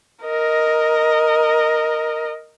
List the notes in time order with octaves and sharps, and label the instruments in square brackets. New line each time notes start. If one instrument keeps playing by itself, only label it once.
[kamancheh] A#4 D#5